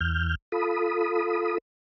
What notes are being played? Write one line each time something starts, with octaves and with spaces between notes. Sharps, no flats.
E2 F6 G6
F4 A4 B5 D#6